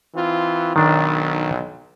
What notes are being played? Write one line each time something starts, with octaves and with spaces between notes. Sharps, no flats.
E3 C4 F4
B1 D#3 D4